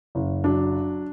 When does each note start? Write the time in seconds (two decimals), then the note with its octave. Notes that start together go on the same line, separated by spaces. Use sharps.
0.15 F#1
0.44 F#3 D4